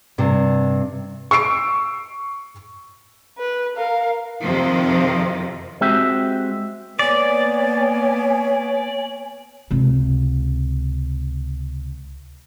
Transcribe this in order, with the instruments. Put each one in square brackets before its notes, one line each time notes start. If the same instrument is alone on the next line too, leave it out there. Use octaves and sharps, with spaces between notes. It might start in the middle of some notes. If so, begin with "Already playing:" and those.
[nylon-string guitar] G2 C3
[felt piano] C#6 E6 C7 D7
[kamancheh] B4
A#4 F5
[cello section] F2 C3 D#3 F3
[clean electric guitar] G#3 C4 F#4 G4 E5
[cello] A#3 B3 [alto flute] C#5 [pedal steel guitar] D5 [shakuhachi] G#5
[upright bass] C#2 C3